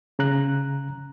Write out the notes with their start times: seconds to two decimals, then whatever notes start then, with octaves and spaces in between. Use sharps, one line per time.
0.19 C#3 A#5 F#6